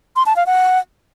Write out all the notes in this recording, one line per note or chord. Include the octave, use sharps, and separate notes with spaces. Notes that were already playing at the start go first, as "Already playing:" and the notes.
C6
A5
F5
F#5